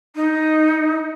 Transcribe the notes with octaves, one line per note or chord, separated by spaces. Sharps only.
D#4